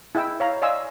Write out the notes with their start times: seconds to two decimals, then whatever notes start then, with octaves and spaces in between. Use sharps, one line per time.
0.15 E4 G#4 D#5 G5 E6
0.40 C#5 F5 A#5
0.62 D5 D#5 F5 G#5 C6 E6